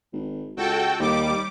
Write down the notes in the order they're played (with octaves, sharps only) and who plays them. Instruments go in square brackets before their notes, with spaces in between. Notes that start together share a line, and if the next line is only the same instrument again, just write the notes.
[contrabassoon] G#1
[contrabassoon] C#2 [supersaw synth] F#4 A4 G5
[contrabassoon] D#2 [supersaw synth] G3 D6